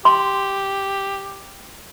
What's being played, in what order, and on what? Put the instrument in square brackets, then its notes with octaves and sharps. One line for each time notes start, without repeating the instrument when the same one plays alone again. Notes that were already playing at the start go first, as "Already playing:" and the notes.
[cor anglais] G4 [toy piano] C6